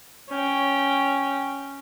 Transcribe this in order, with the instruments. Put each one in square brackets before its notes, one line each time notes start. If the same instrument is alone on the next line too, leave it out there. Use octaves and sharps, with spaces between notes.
[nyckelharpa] C#4 G5